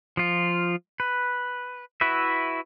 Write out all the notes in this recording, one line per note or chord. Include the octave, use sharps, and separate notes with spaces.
F3 F4
B4
E4 F#4 B4 E5